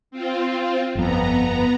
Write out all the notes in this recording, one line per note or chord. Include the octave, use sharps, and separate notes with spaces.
C4 F4
G1 F2 B3 A#5